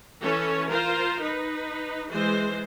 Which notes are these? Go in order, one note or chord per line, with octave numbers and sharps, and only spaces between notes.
E3 C#4 A4 C#5
F4 A#4 C5
D#4 B4
E3 G#3 C5